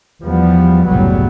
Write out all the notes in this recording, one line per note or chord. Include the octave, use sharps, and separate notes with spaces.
E2 F3 G3 B3
F#1 C2 A2 F#3 G3 B3